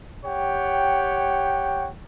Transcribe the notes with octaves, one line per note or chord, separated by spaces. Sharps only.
G4 C#5 F#5 G5